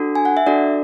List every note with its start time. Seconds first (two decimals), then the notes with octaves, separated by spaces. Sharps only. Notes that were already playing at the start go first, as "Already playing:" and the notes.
Already playing: D4 F#4 A4
0.15 G#5
0.25 F#5
0.37 E5
0.46 D4 F#4 A4 D5